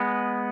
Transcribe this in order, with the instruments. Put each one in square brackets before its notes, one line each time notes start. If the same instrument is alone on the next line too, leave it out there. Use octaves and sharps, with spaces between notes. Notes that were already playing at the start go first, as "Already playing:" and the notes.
Already playing: [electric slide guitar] G#3 B3